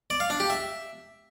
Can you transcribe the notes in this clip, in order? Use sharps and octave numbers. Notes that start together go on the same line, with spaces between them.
D5
F5
D4
G4
E5